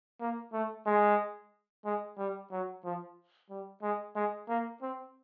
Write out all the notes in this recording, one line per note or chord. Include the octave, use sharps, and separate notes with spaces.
A#3
A3
G#3
G#3
G3
F#3
F3
G3
G#3
G#3
A#3
C4